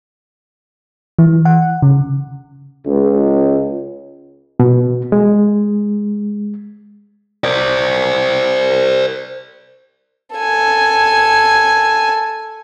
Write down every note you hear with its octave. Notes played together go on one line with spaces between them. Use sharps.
E3
F#5
C#3
C#2
B2
G#3
C5 D5
A4 G#5